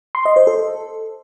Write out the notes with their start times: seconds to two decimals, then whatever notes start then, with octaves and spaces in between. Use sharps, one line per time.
0.15 C6
0.25 D#5
0.36 C5
0.47 A4